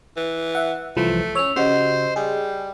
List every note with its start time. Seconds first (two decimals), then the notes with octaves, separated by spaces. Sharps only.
0.17 E3
0.55 E5 F#5
0.97 C2 E3 F3 A3
1.35 C#4 C#5 E6 F7
1.56 C#3 F#4 G4 C5 D#5
2.16 G3 G#4